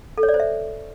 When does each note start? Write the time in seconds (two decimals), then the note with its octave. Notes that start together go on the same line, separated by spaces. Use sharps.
0.18 A4
0.23 C#5
0.29 D5
0.34 C5
0.40 E5